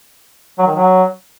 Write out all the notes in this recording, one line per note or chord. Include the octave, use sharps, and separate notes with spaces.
F#3
D#3
F#3